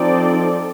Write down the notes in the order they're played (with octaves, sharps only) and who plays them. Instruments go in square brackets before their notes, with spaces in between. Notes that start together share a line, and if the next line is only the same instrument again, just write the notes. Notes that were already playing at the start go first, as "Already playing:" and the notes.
Already playing: [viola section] F3 C4 D#4 A4 D5